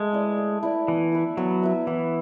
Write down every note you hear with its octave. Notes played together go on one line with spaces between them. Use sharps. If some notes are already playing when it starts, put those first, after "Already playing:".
Already playing: G#3 A3
E4 B4 D5
A3
E4 B4 D5
E3 B3
E4 B4 E5
F#3 B3
E4 B4 E5
E3 B3